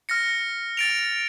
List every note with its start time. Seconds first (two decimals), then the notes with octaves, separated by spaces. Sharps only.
0.09 F6 A#6 C#7
0.77 A6 D7 F7